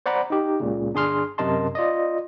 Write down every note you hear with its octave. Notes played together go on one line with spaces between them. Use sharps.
C5 D5 F#5 A#5 B5 D6
D#4 G4
C#2 A#2 C#3
G1 D4 G#4 C6 F6
F#2 C3 A#4 D#5 A5 C6
F4 D5 D#5